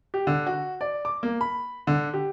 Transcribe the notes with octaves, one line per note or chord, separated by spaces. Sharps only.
G4
D3
F#4
D5
D6
A#3
B5
D3
G4